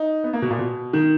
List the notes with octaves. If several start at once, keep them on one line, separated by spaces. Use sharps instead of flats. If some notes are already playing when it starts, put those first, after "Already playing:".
Already playing: D#4
B3
A#3
B2
A#2
B2
D#3